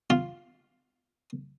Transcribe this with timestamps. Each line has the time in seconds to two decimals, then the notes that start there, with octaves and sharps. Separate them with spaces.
0.10 F4